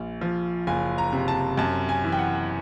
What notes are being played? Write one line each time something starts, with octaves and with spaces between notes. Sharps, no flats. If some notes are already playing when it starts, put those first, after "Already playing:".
Already playing: A#1
F3
F#1 G#5
A#5
C3
A5
F#2 A5
G#5
E3
G5
F#5